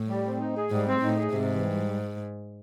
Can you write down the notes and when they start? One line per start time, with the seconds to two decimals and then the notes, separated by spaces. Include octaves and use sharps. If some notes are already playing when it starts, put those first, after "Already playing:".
Already playing: A2
0.09 G3
0.25 C4
0.40 D#4
0.56 G#4
0.71 G#2 G3
0.86 C4
1.01 A2 D#4
1.17 G#4
1.32 G#2 C3
1.48 E3
1.64 G3